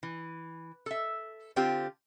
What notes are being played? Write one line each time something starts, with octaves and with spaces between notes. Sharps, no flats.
E3
A4 E5
D3 C4 F4 G4